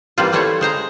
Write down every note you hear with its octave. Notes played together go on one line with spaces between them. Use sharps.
E3 G3 A#3 C4 F4
G3 A3 E4 F4 C5 C#5
G#3 C5 A#5